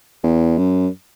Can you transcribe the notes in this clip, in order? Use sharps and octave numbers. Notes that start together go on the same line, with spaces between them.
E2
F#2